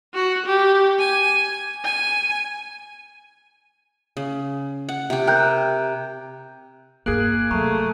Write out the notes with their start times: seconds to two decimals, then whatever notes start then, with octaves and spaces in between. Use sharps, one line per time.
0.14 F#4
0.46 G4
0.99 G#5
1.84 G#5
4.17 C#3
4.89 F#5
5.10 C3 G4
5.27 A#4 G5 F#6 G6
7.06 G1 G2 A#3 G#4 F#6 D7 F#7
7.51 C3 F#3 A3 A#5 C#6 D#7